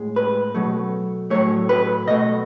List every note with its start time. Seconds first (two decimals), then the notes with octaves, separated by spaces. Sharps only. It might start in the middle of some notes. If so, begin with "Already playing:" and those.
Already playing: A2 G#3
0.16 B4
0.55 B2 F#3 A3
1.30 A2 F#3 A3 C#5
1.69 B4
2.07 B2 D#5
2.10 A3